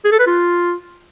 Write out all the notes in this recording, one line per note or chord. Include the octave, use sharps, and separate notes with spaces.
G#4
A4
B4
F4